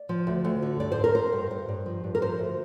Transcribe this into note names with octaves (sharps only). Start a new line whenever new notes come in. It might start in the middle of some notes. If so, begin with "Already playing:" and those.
Already playing: D5
F3
D2
D2
D3
G2 D5
C5
G2
A#4
G2 C5
G2
G2
G2
F3
G2
A#4
F3 C5
D2